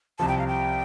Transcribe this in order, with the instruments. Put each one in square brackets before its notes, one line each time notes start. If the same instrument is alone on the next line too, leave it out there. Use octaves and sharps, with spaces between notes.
[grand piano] C2 C3 F3 [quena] A5
[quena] G5
F5
G5